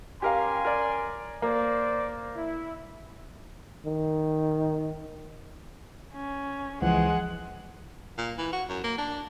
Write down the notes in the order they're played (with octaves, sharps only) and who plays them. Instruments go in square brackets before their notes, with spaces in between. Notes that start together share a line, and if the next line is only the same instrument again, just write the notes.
[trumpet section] C#4 G#5 C6 [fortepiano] G4 A#4 F5
[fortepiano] A#4 D5
[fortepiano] A#3 [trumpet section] C5 D5
[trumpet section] E4
[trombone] D#3
[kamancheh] C#4
[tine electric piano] C#2 E3 F3 [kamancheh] G#3 F#5
[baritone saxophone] A#2
E3
F#4
F#2
A#3
D4